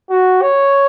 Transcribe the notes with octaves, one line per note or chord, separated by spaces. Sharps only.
F#4
C#5